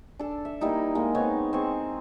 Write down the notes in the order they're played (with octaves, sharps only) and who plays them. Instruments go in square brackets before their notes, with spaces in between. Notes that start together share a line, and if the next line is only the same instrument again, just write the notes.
[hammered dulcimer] D4 A4
E5
G3 A#3 D#4 E4
G#3 A#3 D#5
B3 C4 D#4 C#5
C4 G#4 C#6